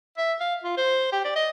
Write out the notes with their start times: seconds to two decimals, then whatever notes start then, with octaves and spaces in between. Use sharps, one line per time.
0.18 E5
0.40 F5
0.64 F4
0.77 C5
1.12 G4
1.25 D5
1.36 D#5